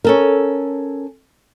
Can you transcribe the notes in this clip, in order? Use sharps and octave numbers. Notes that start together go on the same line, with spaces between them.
C#4 A4 A#4